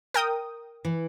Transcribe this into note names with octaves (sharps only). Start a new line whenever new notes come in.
A#4 G5 D#6
E3